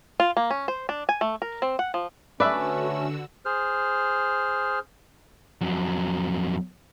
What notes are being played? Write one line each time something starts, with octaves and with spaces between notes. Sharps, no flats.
F4
A#3
C#4
C5
D4
G#5
A3
A#4
C4
F#5
F3
D3 A3 C#4 F#4 B4 D5 E5 E6
G#4 C5 F6
F2 F#3